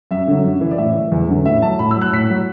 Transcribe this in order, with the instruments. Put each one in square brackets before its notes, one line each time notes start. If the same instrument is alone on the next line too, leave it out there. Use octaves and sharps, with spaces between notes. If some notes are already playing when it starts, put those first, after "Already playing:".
[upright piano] F#2 E5
D3 F#3
F#2
E3
D5
A2 E5
E3
E2
D3 F#3
A2 E5
F#3 A5
A2 B5
E6
F#3
F#6
A2 B6
F#3